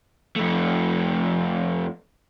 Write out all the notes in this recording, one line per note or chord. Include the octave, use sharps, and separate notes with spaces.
F2 A3